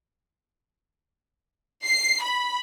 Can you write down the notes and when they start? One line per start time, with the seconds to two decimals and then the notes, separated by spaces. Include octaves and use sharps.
1.84 C7
2.23 B5